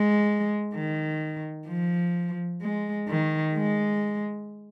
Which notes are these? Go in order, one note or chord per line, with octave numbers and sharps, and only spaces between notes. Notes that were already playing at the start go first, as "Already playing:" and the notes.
Already playing: G#3
D#3
F3
G#3
D#3
G#3